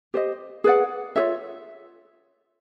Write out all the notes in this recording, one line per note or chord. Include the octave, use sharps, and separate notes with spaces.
G4 C5 D#5
G#4 B4 D5 F#5
F4 G#4 C#5 E5